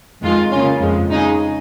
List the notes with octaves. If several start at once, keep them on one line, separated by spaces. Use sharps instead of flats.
F2 D#3 G#3 F4
C#3 A#3 C#4 F4
F2 F3 G#3
C#3 G#3 D#4 G#4